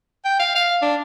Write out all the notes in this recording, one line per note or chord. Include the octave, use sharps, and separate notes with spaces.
G5
F5
F5
D4